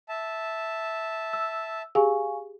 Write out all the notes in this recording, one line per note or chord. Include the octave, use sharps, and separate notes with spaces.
E5 A5
E6
G4 G#4 F5 G#5 C#6